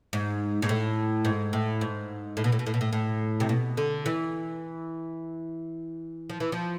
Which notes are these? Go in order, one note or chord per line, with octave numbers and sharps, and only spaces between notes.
G#2
G#2
A2
G#2
A2
G#2
A2
B2
A2
B2
A2
B2
A2
A2
C3
B2
D3
E3
F3
E3
F3